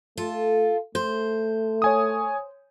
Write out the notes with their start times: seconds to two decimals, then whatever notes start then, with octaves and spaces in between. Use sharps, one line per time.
0.17 A3 F4 A4
0.95 A3 C5
1.82 C#5 G#5 D#6